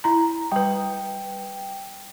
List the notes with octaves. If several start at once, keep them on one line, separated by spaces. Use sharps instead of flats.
E4 A#5
G3 B4 G5